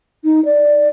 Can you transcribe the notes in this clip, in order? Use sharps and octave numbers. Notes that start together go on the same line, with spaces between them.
D#4
D5